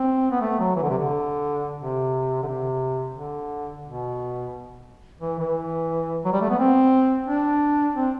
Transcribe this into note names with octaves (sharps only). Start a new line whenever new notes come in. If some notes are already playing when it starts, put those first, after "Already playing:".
Already playing: C4
B3
A3
F#3
E3
D3
C3
D3
C3
D3
C3
D3
B2
E3
E3
F#3
G3
A3
B3
C4
D4
C4